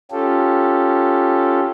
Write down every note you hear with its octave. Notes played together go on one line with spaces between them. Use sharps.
C#4 F4 G4 A4